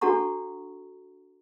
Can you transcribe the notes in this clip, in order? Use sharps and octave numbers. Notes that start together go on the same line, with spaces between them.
D4 F#4 A4 F#5 A#5 C#6